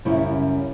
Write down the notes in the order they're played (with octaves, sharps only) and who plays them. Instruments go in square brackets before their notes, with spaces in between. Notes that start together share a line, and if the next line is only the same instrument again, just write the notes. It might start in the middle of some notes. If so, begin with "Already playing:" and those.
[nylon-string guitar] F#2 C#3 G3 C#4 E4